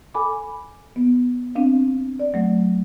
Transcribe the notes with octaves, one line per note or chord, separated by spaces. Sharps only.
A4 G#5 B5 D6
B3
C4 D4 F5
D5
F#3 A3